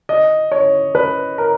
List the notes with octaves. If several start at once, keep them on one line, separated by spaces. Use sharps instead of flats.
D#5
C#5
B4
A#4